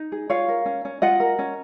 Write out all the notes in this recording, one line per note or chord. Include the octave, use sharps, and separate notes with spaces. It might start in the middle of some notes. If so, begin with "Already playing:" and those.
Already playing: D#4
G#4
F4 C#5 F5
A#4
C#4
C#4
F4 D#5 F#5
A#4
C#4